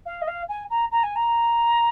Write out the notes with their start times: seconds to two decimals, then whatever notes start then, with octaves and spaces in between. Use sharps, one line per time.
0.05 F5
0.21 D#5
0.27 F5
0.48 G#5
0.70 A#5
0.91 A#5
1.03 G#5
1.15 A#5